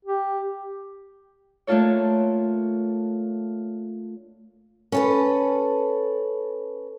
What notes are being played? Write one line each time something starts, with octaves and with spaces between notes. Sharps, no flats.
G4
A3 A#3 D4 F4 A4 C#5
C#4 A4 B4